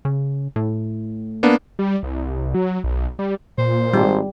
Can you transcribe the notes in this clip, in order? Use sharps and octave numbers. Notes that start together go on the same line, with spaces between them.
C#3
A2
A#3 B3 D4
G3
C2
F#3
B1
G3
A#2 C5
G#1 G3